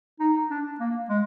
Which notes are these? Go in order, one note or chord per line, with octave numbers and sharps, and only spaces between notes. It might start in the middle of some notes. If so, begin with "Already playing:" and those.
D#4
D4
A#3
G#3